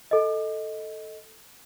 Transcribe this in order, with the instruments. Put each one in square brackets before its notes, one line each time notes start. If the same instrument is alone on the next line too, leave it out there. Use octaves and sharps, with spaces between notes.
[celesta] A4 D#5